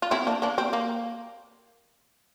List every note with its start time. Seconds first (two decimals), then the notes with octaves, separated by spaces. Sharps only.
0.02 F4
0.11 C4 E4
0.27 A#3 D4
0.42 A#3 D4
0.58 C4
0.73 A#3